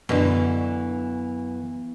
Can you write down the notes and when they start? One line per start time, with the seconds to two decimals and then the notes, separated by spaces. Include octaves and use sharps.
0.09 F#2 B2 D3 E3 B3